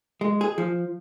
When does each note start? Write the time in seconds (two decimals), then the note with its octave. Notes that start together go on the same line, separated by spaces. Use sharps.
0.21 G#3
0.41 G#4
0.58 F3